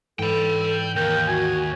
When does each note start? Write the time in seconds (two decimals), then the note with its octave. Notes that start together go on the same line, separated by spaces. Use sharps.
0.19 G#2 E3 A4 G5 B5
0.96 D#2 A#4 G5
1.28 F#4 G#5